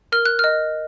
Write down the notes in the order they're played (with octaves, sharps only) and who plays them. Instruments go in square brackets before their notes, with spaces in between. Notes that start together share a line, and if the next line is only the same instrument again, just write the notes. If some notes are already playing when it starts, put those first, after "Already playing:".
[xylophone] A#4 F6
F#6
D#5 F6